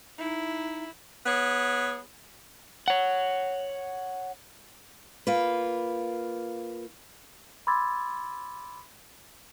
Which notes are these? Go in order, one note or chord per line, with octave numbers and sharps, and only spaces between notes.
D#4 E4
B3 G#4 C#5
C#5 F#5
A#3 F4 B4
B5 C6 D6 E6 G#6 A6